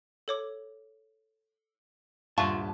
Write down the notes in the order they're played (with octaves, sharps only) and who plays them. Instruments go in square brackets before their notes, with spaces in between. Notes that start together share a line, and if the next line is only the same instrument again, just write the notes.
[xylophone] A4 C#5 D6
[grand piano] D#1 G2 E5 [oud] F4 [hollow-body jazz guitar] F#5 A5 [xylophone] C#6